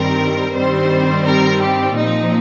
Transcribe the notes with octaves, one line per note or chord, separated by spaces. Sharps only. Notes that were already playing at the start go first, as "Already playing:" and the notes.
Already playing: G2 D#3 G3 C4 A#4
G2 D#3 G3 C4 C5
A#4
G4
A#2 F3 C4 D#4